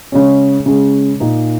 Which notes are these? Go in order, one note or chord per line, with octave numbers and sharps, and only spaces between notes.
C#3 G#3 C#4
C#3 G#3 C#4
A#2 A#3 D#4